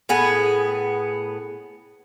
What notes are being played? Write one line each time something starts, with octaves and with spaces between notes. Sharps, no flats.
A2 B3 G#4